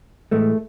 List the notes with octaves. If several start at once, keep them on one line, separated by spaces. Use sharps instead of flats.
A2 E3 G#3 A3